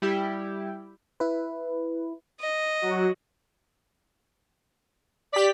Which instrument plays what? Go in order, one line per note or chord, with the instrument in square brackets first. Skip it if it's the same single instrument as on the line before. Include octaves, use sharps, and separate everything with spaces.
[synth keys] G3 E4 G4
[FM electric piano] E4 B4
[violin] D#5
[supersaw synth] F#3 F#4
[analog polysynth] G4 B6 [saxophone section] D5